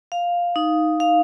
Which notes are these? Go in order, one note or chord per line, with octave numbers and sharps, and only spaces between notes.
F5
D#4
F5